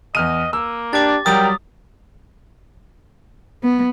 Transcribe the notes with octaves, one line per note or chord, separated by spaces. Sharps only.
E2 D#5 F6 D#7
A#3 E6
D4 G4 D6 A6
F#3 G3 A#4 G5 D#6 A6
B3